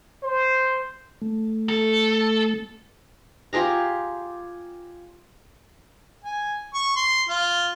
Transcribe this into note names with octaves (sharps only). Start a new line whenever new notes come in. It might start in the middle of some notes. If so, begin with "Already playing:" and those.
C5
A3
A4
F4 G4 G#4 A#5
G#5
C#6
C6
F4